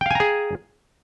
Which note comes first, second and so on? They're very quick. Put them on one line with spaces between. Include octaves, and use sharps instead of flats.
G5 F5 G#5 A#5 G#4